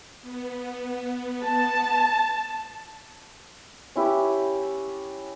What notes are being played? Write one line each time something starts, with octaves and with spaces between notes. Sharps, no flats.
B3
A5
C#4 E4 G4 B4